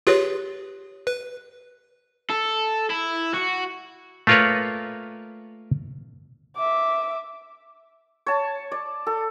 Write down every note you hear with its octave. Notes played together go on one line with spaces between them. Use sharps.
F4 G4 G#4 B4 C#5
B4
A4
E4
F#4
A3 A#3 F4 A#4 B4 C#5
E5 D6
C#5 A5
D5
A4